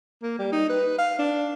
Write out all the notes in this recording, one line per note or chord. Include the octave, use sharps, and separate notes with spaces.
A#3
G3
D#4
B4
F5
D4